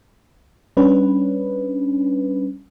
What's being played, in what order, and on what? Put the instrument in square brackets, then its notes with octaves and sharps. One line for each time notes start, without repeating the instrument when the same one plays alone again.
[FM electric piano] G3 C#4 D4 B4